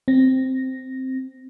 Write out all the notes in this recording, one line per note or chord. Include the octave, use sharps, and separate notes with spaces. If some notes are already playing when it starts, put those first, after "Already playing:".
C4 A#6